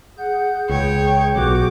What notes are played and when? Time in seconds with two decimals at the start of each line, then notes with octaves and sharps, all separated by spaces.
0.18 G#4 F#5 G6
0.69 C#2 C#5 G5
1.36 B1 F#4 D6